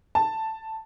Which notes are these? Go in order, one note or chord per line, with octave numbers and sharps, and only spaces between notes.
A5